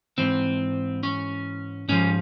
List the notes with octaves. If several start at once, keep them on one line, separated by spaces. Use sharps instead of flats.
G#2 E3 C4
C#4
G#2 F3 C#4